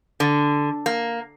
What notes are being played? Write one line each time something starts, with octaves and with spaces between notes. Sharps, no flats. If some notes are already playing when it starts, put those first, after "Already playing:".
D3
A#3